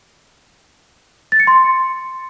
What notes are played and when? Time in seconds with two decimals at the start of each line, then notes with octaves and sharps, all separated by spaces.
1.32 A6
1.40 C#7
1.47 C6